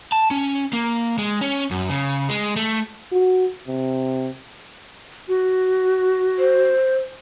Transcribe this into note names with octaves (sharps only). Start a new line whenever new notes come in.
A5
C#4
A#3
G#3
C#4
F#2
C#3
G#3
A3
F#4
C3
F#4
C5